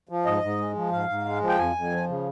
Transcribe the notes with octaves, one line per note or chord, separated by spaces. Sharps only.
F3
G#2 D#5
G#2
G#3
F3
G#2 F5
G#2
G#3
F3
G5
F2 G#5
F2
F3
C#3